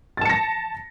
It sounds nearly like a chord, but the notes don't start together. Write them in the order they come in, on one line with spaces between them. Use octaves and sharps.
A6 A5 C#7 A#6